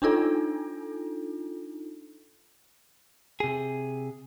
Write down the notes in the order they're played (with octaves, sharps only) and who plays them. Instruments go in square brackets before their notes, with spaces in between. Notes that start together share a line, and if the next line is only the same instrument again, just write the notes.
[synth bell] D4 D#4 F4 A4
[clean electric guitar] C3 G#4